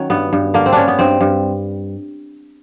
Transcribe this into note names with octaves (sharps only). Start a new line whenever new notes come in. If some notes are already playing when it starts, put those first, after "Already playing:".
Already playing: D#3 F#3 C#4
G2 B3
G2
D3 A#3
C4
G3 C#4 D4
B3
G2 C4
G2